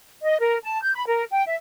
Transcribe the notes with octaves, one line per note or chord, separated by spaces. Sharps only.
D#5
A#4
A5
G6
B5
A#4
G5
E5